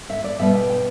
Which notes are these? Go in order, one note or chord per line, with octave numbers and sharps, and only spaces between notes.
E5
D5
B2 G3 B3 E5
G5
G5